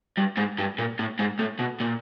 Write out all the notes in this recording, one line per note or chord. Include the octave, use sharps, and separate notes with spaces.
G2
G#2
G2
A#2
A2
G#2
A2
B2
A#2